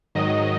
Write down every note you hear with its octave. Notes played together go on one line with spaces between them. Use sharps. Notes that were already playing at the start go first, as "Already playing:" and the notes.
G#2 D#3 F#3 D#5